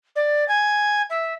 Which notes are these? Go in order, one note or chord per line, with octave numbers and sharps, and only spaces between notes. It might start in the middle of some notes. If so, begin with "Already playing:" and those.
D5
G#5
E5